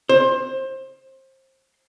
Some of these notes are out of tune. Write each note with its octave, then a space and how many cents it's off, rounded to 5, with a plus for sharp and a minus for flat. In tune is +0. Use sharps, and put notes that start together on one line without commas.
C5 +25